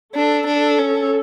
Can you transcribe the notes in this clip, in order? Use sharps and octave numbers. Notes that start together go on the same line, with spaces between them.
D4 A4
D4
C#4